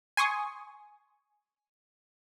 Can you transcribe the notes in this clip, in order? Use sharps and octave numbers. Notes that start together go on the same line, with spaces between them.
G#5 C6 C#6 D#6